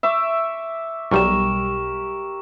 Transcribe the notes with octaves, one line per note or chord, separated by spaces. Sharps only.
E5 C#6 D6
B1 G3 G4 A#4 C#6 E7